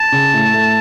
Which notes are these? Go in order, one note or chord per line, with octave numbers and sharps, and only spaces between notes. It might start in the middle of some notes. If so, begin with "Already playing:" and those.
Already playing: A5
C#3
A2
A3